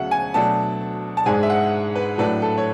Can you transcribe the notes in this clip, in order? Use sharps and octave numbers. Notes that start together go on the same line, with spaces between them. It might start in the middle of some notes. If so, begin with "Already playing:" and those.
Already playing: D2 C#3 F#3 B3 E5 F#5
G#5
B2 F#3 A3 D4 A5
A5
G#2 G#3 D4 G#5
E5
F#5
B4
A2 F#3 A3 D4 B4
A4
C#5